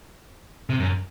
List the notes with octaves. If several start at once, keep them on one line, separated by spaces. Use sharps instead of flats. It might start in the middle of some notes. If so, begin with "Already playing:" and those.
C3
F#2